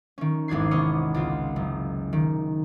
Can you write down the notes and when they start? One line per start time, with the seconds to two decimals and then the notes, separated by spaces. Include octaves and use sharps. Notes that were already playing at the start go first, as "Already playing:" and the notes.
0.18 D#3 C#4
0.48 G#1 E2 D4 G#6 C7
0.71 E2 C3 B3 C#5 D#5 F6
1.14 C#2 F4
1.56 F#1
2.13 D#3